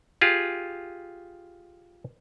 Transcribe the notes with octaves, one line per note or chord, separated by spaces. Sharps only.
F4 G4 G#4